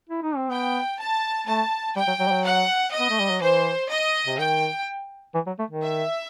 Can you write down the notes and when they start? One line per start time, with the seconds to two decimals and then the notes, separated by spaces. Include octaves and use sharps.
0.10 E4
0.23 D#4
0.36 C4
0.50 B3 G5
0.98 A5
1.47 A3 A5
1.96 G3 G5
2.07 F#3
2.19 F#3
2.27 G3
2.31 F#3
2.44 F#5
2.92 D#5
2.99 B3
3.10 A3
3.20 G3
3.30 F#3
3.41 E3 C5
3.89 D#5
4.26 C3
4.38 D#3 G5
5.34 E3
5.46 F#3
5.59 A3
5.70 D#3
5.82 E5